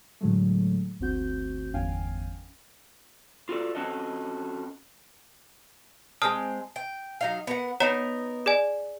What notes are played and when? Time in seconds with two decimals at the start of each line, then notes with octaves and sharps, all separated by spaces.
0.21 A2 D3 F#3 G#3 A3
1.00 G1 D2 C4 F#4 G6
1.73 G1 E2 C#4 F5 G5 G#5
3.49 F4 F#4 A4 D5
3.75 C4 C#4 F#4 A4 D#5
6.22 G#3 A#3 C4 A5 D#6 F6
6.76 G5
7.21 F#3 D#4 F5
7.47 B3 A#4 F#5
7.80 B3 D#4 A#4 C#5 F#5 A#5
8.46 G#4 D5 G#5